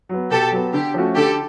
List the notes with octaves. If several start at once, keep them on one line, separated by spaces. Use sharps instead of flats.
F#3 B3
B2 G4 A4
F#3 B3
D3 G4
F3 A3 C#4 F#4
D3 G4 A4